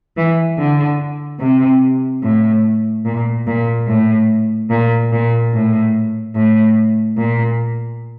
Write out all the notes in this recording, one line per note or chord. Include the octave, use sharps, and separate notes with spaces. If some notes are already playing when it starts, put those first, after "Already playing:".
E3
D3
C3
A2
A#2
A#2
A2
A#2
A#2
A2
A2
A#2